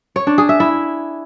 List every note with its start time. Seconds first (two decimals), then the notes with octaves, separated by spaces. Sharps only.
0.16 C#5
0.27 D4
0.38 G#4
0.49 E5
0.60 E4